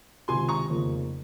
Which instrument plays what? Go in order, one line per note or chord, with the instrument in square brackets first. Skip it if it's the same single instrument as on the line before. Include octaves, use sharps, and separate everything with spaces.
[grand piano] C#2 C3 D#3 [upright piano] G#5 C6
[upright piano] A#5 C#6
[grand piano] F1 F2 C#3 F3 A#3